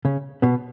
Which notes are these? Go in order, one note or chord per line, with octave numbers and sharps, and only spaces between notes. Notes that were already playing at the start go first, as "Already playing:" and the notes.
C#3 C#4
B2 B3